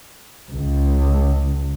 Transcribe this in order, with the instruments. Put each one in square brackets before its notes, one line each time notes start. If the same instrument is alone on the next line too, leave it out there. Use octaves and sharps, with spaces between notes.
[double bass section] C#2